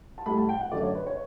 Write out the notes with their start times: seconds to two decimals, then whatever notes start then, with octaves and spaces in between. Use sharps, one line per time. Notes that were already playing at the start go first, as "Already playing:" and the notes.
0.18 A5
0.26 A2 G3 B5
0.38 A5
0.49 G5
0.61 F#5
0.71 F#2 D3 A3 D5
0.83 C#5
0.95 B4
1.07 C#5